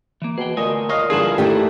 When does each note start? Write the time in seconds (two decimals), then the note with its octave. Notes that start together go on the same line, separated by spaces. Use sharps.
0.22 E3 A#3
0.38 B2 G#4 G5
0.57 D2 A#2 A3 D#5 G#5
0.89 C#5 D#5 F5
1.10 G2 D3 E4 F4 G#4
1.38 D#3 A3 A#3 D4 E4 G4